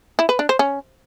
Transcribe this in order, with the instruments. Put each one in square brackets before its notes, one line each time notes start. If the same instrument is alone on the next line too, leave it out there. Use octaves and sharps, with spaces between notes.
[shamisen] E4
B4
D4
C5
C#4